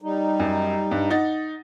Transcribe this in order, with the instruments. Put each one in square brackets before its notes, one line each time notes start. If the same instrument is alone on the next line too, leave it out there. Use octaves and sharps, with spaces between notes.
[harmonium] G3 D#4
[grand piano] F#2
G2
D#4 F#5 A6